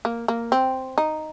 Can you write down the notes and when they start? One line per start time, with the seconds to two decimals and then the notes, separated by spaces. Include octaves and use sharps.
0.05 A#3
0.28 A#3
0.52 C4
0.98 D#4